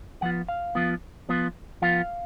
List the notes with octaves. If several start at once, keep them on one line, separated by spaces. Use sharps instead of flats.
F3 B3 F4 F#5
F5
F3 B3 F4
F3 B3 F4
F3 B3 F4 F5